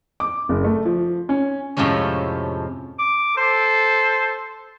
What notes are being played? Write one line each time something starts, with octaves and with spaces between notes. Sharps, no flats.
D6
F#1
A3
F3
C#4
F2 A2 C3 F3 G#3 C#4
D6
A4 C5